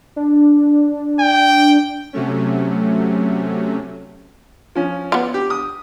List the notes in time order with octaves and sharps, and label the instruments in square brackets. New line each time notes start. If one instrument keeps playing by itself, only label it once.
[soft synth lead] D4
[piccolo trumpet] G5
[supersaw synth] C3 F#3 A3 C#4
[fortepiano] F3 C#4
[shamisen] B3 F4
[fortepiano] G4
D#6